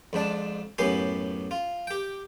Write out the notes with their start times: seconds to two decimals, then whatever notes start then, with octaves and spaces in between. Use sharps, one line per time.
0.13 F2 G#2 D4 A5
0.78 F#2 A2 B3 G4 G#5 C6
1.51 F4
1.87 G4 G5